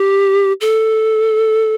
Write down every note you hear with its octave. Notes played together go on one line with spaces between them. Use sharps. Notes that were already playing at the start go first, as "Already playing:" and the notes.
Already playing: G4
A4